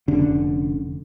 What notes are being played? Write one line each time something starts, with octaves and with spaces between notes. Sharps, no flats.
F1 D3 C#4